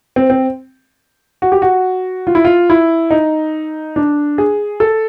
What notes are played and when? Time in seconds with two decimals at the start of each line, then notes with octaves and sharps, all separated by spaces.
0.16 C4
0.30 C4
1.42 F#4
1.52 G4
1.62 F#4
2.27 F4
2.35 E4
2.45 F4
2.70 E4
3.11 D#4
3.96 D4
4.38 G#4
4.80 A4